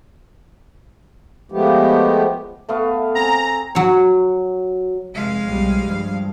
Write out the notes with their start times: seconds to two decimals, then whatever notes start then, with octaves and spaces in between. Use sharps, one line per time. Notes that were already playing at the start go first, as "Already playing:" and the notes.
1.52 F3 G#3 A3 B3 G4
2.69 A3 B3 F5
3.15 C4 G#5 A#5
3.75 F#3 C#5
5.14 F1 G#3 F5
5.45 B1 F3 G3
5.85 G2 F3